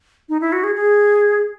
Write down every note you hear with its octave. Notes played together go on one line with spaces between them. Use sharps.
D#4
E4
F#4
G#4
G#4